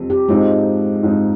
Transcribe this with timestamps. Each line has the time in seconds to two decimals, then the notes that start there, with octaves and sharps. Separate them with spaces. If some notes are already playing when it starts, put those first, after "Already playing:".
Already playing: F2 C3 G3
0.10 G4
0.29 G#2 F3 G#3 C4 D#4
1.03 G#2 F3 C4 D#4